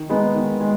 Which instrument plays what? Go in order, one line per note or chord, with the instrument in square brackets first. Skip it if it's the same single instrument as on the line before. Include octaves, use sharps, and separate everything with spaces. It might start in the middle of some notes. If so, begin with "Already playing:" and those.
Already playing: [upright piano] D#3
G#3 B3 D#4
D#3
G#3